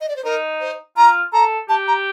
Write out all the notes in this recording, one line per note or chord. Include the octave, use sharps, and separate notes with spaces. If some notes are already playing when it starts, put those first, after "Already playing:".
D#5
D5
C5
D#4 A#4
C5
F4 A#5
A4 A#5
G4 A5
A#5